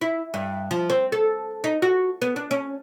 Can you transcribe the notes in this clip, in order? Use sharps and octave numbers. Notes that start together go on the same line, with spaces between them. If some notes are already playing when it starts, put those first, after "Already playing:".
E4
G2
F3
C4
A4
D#4
F#4
B3
D4
C#4